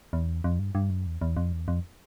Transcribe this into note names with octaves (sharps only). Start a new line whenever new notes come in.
E2
F2
G2
G2
F#2
E2
E2
F2
E2
F2